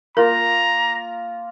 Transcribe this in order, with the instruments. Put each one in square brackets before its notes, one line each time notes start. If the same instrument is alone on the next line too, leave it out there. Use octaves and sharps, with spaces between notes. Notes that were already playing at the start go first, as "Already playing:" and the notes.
[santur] A#3 F4 [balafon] A#4 [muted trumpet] A#5